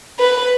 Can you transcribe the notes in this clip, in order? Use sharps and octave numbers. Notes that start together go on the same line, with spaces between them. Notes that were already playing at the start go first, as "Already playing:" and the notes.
B4